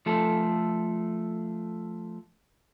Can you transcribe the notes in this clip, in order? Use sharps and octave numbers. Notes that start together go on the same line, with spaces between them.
F3 A3 A4